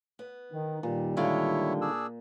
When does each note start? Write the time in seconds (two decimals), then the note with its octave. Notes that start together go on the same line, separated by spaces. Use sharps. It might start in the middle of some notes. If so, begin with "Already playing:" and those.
0.19 B3
0.53 D#3
0.83 A#2 D#3 G3
1.17 D3 G#3 E4 F4 C#5 E5
1.81 D4 G#4 E6